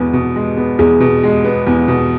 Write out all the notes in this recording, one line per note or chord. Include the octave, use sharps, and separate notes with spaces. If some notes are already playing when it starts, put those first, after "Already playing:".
Already playing: E2 B2 G#3 B3
B2
G#3
B3
E2 G#4
B2
G#3
B3
E2
B2